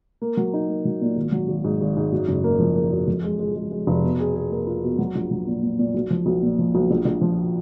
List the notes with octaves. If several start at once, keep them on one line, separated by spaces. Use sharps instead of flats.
A#3
F#3
D#4
A#3
F#3
A#2
G#1
F#3
G#1
G#2
G#1
G#2
F#2
F#1
A#3
F3
A#3
F#2
F2
G#3
G#3
G#3
G#3
F1
B2
G#4
G#4
A#3
F4
B2
F#3
A#1
F#3
A#2
A#2
A#2
B1
F3
B1
A#2
F3
B1
A#1
A#1
F3